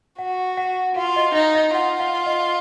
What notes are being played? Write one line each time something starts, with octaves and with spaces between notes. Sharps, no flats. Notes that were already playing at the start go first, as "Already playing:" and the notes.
F#4 F#5
F#5
F4 F5
D#5
D#4 D#5
D#5
F4 F#5
F5
D#5